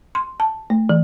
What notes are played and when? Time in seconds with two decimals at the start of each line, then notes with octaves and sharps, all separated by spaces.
0.15 C6
0.40 A5
0.70 A3
0.89 E3